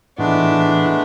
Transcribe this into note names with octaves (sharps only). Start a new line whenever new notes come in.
A2 E3 G#3 A3 B3 D4 E4